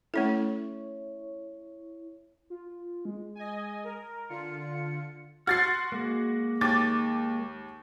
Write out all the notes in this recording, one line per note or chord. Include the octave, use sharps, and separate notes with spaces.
A3 C#4 E4 A4 C#5
F4
G#3
D#5 G#5
A#4
D3 F4 C#7
F#4 C6 F6 A6 C7
G#3 A#3
D#2 D6 A6